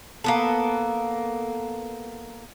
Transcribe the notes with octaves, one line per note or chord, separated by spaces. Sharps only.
A#3 B3 A4